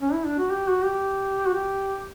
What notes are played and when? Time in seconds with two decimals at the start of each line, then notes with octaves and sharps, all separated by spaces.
0.01 C#4
0.14 E4
0.26 D4
0.39 F#4
0.52 G4
0.69 F#4
0.85 G4
1.46 F#4
1.54 G4